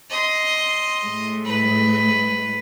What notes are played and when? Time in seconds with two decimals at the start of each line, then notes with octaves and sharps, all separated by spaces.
0.10 D#5 C6
1.03 A2 G#3 A3
1.45 B4